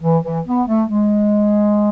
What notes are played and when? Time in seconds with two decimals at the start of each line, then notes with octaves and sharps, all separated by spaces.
0.02 E3
0.23 E3
0.46 B3
0.68 A3
0.89 G#3